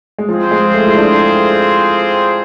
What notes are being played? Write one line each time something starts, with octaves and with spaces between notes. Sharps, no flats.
G#3
F3 C4 F4 G#4 C5
G#3
A3
E4
D4